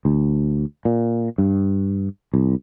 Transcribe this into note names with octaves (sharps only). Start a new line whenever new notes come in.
D2
A#2
G2
C2